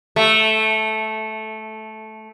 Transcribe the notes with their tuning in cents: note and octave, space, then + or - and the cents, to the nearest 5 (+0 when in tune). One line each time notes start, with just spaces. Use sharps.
A3 -10